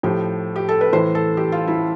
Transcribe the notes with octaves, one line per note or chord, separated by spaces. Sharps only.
A2 F3 G4
G4
A4
B4
A2 E3 C5
A4
G4
F4
E4